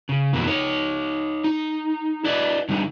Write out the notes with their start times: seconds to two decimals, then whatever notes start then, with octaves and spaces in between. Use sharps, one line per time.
0.09 C#3
0.33 F2 B2 E3 A#3
0.48 D#4 C#5
1.44 D#4
2.24 E4 B4 D5 D#5
2.69 D3 G3 D#4